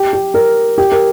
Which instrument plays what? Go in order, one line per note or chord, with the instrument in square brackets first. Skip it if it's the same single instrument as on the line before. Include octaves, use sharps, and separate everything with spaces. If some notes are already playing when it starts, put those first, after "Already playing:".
Already playing: [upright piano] G4
G4
A#4
G4
A#4